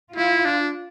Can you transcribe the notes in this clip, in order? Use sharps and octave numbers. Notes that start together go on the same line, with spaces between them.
E4 F4
D4